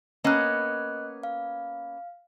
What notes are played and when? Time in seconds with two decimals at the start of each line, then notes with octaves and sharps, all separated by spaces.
0.24 A#3 B3 C#4 D#5 F#6
1.23 F5